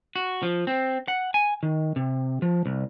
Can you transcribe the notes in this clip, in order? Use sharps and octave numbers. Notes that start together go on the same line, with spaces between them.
F#4
F3
C4
F#5
G#5
D#3
C3
F3
C2